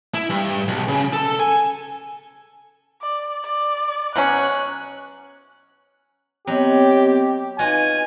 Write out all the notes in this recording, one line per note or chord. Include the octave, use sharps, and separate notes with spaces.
E4
G2
B1
C#3
A4
G#5
D5
D5
B2 F#3 C#4 F#6
F#3 B3 C4 G4 D#5
D#4 F4 F#4 B4 D#5 G#5